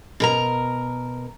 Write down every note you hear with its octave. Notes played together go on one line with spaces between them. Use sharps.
B2 A#4 A#5